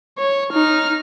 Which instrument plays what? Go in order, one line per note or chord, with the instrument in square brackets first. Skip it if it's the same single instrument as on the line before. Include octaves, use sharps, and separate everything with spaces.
[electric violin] C#5
D#4 F6